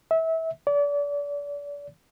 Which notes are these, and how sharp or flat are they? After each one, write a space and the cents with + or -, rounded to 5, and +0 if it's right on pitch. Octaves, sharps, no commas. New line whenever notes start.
E5 -25
D5 -35